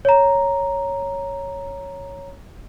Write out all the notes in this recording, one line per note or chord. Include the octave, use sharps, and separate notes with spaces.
C#5 A#5